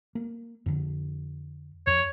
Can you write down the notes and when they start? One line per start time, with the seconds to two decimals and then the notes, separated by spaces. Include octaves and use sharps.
0.15 A#3
0.66 F2 D3
1.87 F2 C#5